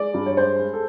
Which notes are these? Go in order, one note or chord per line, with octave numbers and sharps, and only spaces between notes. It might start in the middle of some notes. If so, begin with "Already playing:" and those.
Already playing: G#3 D5
G2
C#5
G#3 C5
G#3
A4